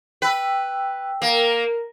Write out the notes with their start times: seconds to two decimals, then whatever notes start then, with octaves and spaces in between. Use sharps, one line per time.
0.22 B4 G5 E6
1.22 A#3 A#4